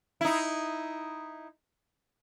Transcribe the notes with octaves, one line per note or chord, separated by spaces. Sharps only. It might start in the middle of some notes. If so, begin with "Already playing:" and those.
D#4 E4